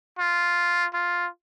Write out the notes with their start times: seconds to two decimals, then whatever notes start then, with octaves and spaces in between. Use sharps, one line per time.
0.19 F4
0.94 F4